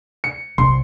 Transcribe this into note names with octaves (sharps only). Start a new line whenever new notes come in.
C#7
C2 C6